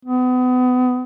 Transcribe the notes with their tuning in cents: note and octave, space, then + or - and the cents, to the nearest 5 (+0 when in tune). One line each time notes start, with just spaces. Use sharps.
B3 +30